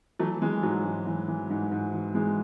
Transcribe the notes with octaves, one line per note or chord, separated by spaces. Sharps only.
E3 F#3 A3
E3 G#3
G#2 F#3
G#2
E3
E3
G#2
G#2
E3
E3 G#3